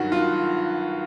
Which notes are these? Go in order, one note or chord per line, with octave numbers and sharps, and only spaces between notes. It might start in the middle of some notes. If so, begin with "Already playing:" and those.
Already playing: G2 D#3 F#3 F#4
F4